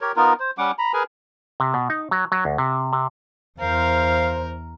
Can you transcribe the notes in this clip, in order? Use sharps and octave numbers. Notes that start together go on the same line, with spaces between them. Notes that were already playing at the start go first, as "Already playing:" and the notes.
G4 A#4 C#5
B3 D#4 F4 A#4
C5
G3 C#4 F#5 D6
A#5 B5
G#4 A#4 B4 G#5
C3
B2
D#4
F#3
F#3
D2
C3
C3
E2 A#4 C5 F5